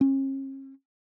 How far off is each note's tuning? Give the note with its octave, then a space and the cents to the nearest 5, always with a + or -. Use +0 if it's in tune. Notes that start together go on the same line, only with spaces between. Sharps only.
C#4 -45